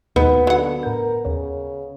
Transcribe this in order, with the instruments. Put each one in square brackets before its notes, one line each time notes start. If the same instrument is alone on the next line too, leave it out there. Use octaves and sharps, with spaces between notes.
[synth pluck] D#2 [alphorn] B2 [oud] B3 [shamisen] D#4
[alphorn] D3 [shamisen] F#3 F#5
[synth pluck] A2 G6 [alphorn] A#4
[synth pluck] D#2 C#5 [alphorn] C#3